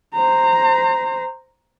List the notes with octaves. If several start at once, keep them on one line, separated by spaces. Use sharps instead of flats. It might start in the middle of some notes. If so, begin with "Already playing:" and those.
C5 A#5